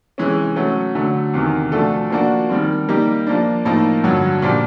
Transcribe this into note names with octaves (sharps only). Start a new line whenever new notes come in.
C3 E3 G#3 C#4
F#3 A3 C#4
D3 F#3 A3
E2 C3 D#3
F3 A3 D4 F#4 A4
F3 A#3 D4 F#4
D#3 G3 C4
G3 A#3 D#4 G4
F3 A#3 D4
A2 F3 A#3 D#4
G2 D3 F#3
A#2 F3 A#3 D4 G4